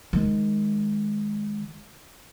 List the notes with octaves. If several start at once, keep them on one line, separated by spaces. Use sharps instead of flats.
D#3 G#3